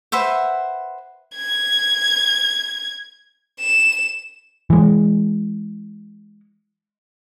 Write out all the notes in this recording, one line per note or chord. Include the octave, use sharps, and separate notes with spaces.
B4 C5 E5 F#5
G#6
E7
E3 G#3